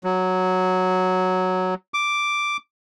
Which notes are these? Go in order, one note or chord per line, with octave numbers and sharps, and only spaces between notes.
F#3
D6